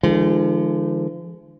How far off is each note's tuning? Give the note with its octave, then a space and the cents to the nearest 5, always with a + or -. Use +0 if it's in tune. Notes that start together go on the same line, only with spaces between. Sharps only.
D3 +30 F3 -40 G#3 +0